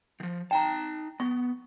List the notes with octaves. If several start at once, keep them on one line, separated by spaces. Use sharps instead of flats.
D#3 F3
D#4 G5 A5 A#5
B3 C#6